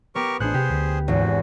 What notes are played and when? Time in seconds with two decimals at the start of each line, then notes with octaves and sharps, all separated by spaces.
0.15 B3 G4 A#4 C#6
0.40 A1 D4 G#4 C5 F#6 C#7
0.54 C3 G4
0.70 D2
1.08 G#1 E2 F#4